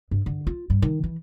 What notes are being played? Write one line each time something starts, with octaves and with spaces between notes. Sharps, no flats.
G2
D3
F4
G2
D#3
E3